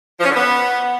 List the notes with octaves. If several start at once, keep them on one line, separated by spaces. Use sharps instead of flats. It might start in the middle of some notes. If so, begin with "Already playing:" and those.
F3
C#4
D3
B3